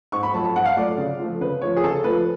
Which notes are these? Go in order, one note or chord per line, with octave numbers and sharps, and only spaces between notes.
G#2 C#6
B5
F#3 A3 F4 A5
A5
G#2 F#5
F5
F#3 A3 F4 D5
C#3
F3 A3 F4
C#3 B4
F3 A3 F4 C#5
G#4
C#3 A4
F3 A3 F4 B4